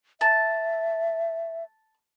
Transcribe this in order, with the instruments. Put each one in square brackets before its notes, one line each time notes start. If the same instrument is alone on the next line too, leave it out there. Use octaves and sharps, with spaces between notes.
[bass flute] E5 [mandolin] A5